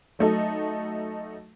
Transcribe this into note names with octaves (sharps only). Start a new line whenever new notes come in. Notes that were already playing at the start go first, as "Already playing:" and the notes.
F#3 A3 D#4 A4